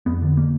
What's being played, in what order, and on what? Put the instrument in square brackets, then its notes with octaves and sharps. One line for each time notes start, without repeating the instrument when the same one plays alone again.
[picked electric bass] F2 B3
D3
A#3